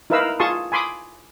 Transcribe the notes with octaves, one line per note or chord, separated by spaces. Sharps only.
D#4 E4 A#4 B4 F5 E6
F4 G#4 A5 C6 C#6 D#6
G#5 B5 C6 D6 D#6